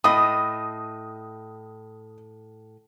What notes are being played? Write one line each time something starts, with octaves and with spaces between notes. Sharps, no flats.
A2 D#5 D#6